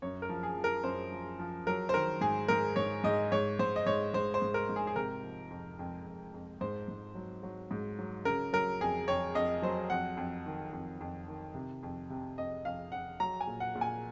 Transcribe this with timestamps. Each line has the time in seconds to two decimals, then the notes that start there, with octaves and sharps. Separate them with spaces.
0.02 F#2 C#5
0.22 A#4
0.29 F3
0.43 G#4
0.57 F3
0.64 A#4
0.84 F#2 C5
1.12 F3
1.39 F3
1.67 F#3 A#4
1.89 C5
1.94 D#3 A#4
2.21 G#2 G#4
2.48 G#2 A#4
2.76 G#2 C#5
3.04 G#2 D#5
3.32 G#2 C#5
3.59 G#2 C5
3.76 D#5
3.86 G#2 C#5
4.14 G#2 C5
4.34 C5
4.42 G#2
4.54 A#4
4.69 G#2
4.76 G#4
4.87 G#4
4.96 C3 A#4
5.23 F3
5.50 F2
5.79 F2
6.06 F2
6.34 F2
6.61 G#2 C5
6.88 G#2
7.15 F#3
7.43 F#3
7.71 G#2
7.99 F#3
8.25 C#3 A#4
8.53 F#3 A#4
8.81 F2 G#4
9.08 F2 C#5
9.35 F2 D#5
9.62 F#3 C5
9.90 F2 F#5
10.17 F2
10.46 D#3
10.73 F2
11.01 F2
11.28 D#3
11.55 C3
11.83 F2
12.10 C3
12.38 F2 D#5
12.65 F2 F5
12.92 F2 F#5
13.20 F#3 A#5
13.41 G#5
13.47 A#2
13.60 F#5
13.75 A#2
13.81 G#5